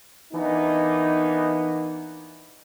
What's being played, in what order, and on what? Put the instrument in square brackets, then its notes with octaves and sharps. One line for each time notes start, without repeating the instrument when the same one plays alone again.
[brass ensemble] E3 A#3 B3 D4 D#4